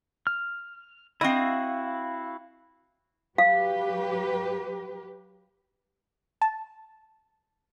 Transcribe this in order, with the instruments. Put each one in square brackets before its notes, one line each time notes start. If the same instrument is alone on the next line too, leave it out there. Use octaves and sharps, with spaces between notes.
[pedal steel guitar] F6
[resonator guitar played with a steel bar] C4 D#5 [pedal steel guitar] E4 F#4 F5
[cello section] F#3 G4 B4 [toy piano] F5
[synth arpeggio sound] A5